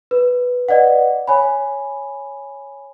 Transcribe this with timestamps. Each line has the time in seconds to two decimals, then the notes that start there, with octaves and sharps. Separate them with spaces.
0.11 B4
0.69 B4 D5 D#5 F#5
1.28 C#5 G#5 B5